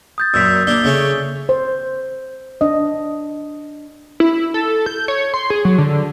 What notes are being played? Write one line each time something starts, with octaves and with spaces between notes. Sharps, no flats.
D#6 G6 A6
F#2 A#2 E6 B6
A#3 D4 G7
C#3 A3 C#4
C5
D4 D#5
E4
A4
G6
C#5
C6
G#4
F#3
D3